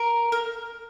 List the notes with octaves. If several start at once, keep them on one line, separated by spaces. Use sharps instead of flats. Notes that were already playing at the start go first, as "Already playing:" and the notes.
Already playing: A#4
A#4